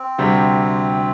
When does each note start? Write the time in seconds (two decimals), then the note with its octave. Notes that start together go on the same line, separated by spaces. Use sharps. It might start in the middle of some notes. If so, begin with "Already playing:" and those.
Already playing: C4
0.18 D2 C3 G3